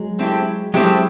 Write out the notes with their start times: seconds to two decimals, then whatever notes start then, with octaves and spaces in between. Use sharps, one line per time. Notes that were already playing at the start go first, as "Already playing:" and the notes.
Already playing: F#3 G#3
0.19 A3 C4 E4 G4
0.74 F#3 G#3 A3 C4 E4 G4